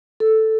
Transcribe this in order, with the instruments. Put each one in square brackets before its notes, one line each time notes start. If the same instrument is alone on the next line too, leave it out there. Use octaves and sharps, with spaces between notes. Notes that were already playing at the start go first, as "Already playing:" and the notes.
[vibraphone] A4